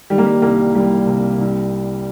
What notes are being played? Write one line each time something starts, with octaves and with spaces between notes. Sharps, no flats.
D#3 G3
A#3
G3
C2 A#3
C2 G3
C3
C2